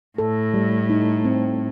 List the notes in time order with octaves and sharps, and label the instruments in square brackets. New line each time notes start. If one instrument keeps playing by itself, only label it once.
[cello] A2 [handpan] A4
[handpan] G3
D#4
C4